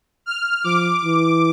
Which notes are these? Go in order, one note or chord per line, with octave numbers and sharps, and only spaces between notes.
F6
F3 D6
E3